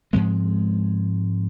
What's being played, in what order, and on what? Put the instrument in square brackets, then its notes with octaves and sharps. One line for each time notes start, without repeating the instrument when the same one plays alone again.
[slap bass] G#2 F3 G#3 C4